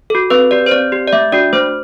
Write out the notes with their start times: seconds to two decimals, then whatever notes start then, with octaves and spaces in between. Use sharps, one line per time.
0.10 F#4 A4
0.30 C4 B4
0.51 G4 D5
0.66 C5
0.71 C4 D5
0.92 G4
1.08 D5
1.13 A3 E5
1.32 D4 F#4 D5
1.53 A3 C5